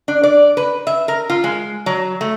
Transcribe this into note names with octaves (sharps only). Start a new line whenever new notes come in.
D4
D5
B4
E5
A#4
F4
G#3
F#3
A3